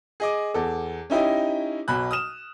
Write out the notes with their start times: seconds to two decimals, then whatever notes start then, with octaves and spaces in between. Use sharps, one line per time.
0.20 G#4 D#5 D6
0.54 E2 A4
1.10 C#4 D#4 E4 G4 D#5
1.88 B1 B2 B5 F#6
2.11 D#6 F6 E7